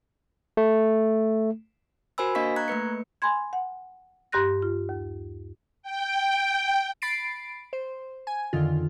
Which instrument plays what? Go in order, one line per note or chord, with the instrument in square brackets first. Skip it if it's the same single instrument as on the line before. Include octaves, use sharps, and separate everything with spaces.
[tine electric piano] A3
[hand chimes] F#4 A#4 C5 G#5 B5 E6
A#3 D4 D#5 F5 C#6 B6
A#5 C#6 F#6 G#6
A3 A#3 B4 C#7
[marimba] G#5 B5 C6 G#6
F#5
G2 G4 C6 F#6 A#6
F4
D#2
[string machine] G5
[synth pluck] B5 A6 C7 D7
C5
G#5
F2 D3 D#3 F4